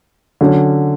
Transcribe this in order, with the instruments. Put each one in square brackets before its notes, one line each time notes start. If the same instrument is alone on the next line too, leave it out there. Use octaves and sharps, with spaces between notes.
[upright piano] D3 F#3 C#4